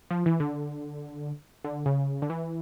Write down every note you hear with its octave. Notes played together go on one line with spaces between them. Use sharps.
F3
E3
D3
D3
C#3
D3
E3